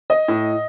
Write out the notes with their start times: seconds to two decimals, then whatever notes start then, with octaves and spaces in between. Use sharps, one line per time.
0.10 D#5
0.28 A2